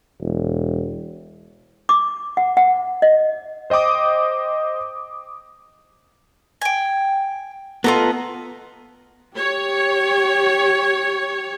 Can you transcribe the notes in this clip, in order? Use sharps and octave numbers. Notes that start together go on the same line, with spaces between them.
E1
D6
F#5
F#5
D#5
C5 D#5 G5 D6 D#6
G5 G#5
B3 F4 A4 D#5 A#5
G4 C#5